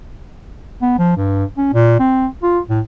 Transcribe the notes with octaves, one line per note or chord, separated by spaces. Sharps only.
B3
F3
G2
C#4
A#2
C4
F4
A2